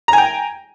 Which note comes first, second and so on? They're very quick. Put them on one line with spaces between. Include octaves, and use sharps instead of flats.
A#5 G#5 G5